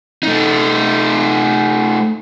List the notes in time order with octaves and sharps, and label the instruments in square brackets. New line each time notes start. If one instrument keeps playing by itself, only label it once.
[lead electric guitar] A3 D#4